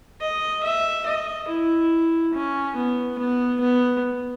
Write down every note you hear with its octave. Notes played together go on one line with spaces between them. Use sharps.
D#5
E5
D#5
E4
C#4
B3
B3
B3